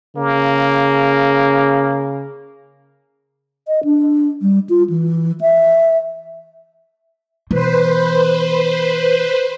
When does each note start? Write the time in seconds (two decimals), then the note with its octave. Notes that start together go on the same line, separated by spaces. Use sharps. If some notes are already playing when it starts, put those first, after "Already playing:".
0.17 C#3 A#3
3.67 D#5
3.84 D4
4.42 G3
4.69 F4
4.89 E3
5.41 E5
7.51 B2 E3 B4 C5